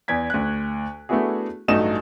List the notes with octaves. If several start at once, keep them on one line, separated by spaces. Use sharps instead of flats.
E2 D5 G#6 B6
D2 F#6
A3 B3 D4 E4 F#4 G#4
A1 G2 F#3 A3 D#4 E7